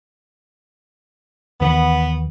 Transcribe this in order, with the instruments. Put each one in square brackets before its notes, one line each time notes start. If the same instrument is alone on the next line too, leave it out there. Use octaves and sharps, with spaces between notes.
[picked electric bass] D#2 D#3 E3 [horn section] B3